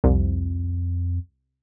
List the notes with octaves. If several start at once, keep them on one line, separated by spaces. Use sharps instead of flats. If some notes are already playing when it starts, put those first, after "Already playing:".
C2 F2